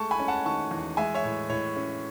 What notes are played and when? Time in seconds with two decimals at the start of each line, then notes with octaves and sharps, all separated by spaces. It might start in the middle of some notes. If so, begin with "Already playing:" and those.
Already playing: G#3 A3 A5 C#6
0.11 G#5 B5
0.20 C#4
0.28 F#5 A5
0.45 D#3 A5 C#6
0.71 E2
0.97 G#3 E5 G#5
1.15 C#5 E5
1.24 A2
1.49 A2 C#5
1.76 C#4